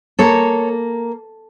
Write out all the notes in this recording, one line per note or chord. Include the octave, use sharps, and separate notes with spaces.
A#3 A4 C#5